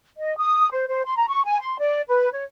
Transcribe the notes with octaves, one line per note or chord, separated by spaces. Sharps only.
D#5
D#6
C5
C5
C6
A#5
C#6
G#5
C6
D5
B4
C#5